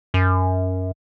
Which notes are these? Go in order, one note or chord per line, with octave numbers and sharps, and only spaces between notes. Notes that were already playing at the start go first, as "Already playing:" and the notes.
F#2